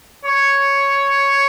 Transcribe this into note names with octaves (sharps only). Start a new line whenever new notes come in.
C#5